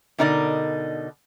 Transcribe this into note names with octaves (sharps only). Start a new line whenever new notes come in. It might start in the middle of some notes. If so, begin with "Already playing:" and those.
B2 D3 D#4 A#4 D5 D#5